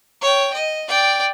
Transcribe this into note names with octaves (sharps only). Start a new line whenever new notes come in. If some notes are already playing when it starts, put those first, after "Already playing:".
C#5 G5
D#5
D5 G5